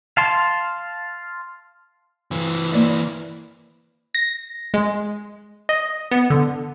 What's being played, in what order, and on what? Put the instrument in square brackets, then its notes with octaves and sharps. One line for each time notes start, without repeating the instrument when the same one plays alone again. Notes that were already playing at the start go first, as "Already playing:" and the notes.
[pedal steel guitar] F5 A5 C6
[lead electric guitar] E3 C4
[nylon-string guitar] A#3 D5 E5
[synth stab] A#6
G#3
D#5
B3
D3